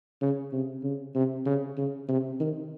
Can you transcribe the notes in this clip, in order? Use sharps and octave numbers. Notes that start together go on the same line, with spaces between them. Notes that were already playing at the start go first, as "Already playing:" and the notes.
C#3
C3
C#3
C3
C#3
C#3
C3
D#3